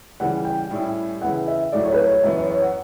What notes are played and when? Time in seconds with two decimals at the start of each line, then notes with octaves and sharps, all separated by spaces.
0.20 C#3 E3 G3 F#5
0.45 G5
0.71 A2 G3 C#4 E4
1.21 C#3 E3 B3 E4 F#5
1.48 E5
1.72 A2 F#3 A3 E4 D5
1.85 C#5
1.93 B4
1.98 C#5
2.11 C#5
2.24 F#2 E3 B3 E5
2.36 C#5
2.49 C#5
2.62 F#5